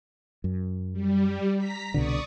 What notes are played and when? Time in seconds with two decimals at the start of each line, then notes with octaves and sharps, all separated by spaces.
0.44 F#2
0.93 G3
1.57 A#5 B6
1.94 C2 B2 D3 D5 C#6 D#6